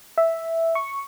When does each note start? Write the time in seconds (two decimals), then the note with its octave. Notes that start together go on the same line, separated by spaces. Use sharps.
0.18 E5
0.75 C#6